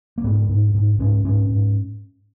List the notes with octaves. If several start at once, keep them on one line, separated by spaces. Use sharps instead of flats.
A#3
G#2 B3
G#2
G#2
G#2 C#4
G#2 C#4
G#2